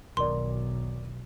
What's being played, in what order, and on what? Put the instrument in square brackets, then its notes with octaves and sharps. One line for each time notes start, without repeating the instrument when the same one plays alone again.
[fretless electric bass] E1 B2 D#3 [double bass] B1 [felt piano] A#4 D5 [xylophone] C6